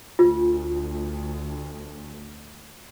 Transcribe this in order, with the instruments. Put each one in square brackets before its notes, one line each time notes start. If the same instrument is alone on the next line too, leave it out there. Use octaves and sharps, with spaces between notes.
[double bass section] D2 [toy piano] F4